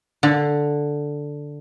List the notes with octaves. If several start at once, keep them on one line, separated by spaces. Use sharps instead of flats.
D3